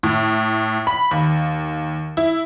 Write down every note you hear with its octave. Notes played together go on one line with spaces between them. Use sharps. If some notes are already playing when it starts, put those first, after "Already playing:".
A2
B5
D#2
E4